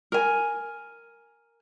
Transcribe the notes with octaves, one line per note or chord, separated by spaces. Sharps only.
A#4 G#5